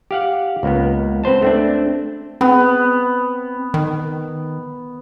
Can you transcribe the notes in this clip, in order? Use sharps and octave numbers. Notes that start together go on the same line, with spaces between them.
G4 F5 F#5
C#2 A#3 B3
C4 B4 C5 A5
A3 C4 D4
B3 C4
D#3